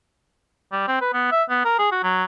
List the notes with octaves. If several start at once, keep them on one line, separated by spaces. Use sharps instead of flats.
G3
C4
B4
B3
E5
B3
A#4
G#4
F#4
F#3